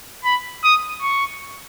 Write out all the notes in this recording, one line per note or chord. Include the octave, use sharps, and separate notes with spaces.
B5
D#6
C#6